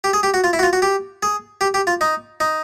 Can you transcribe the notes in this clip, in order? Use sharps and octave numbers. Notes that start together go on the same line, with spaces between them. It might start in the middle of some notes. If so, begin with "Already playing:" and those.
G4
G#4
G4
F#4
F4
E4
F#4
F4
F#4
G4
G#4
G4
G4
F4
D#4
D#4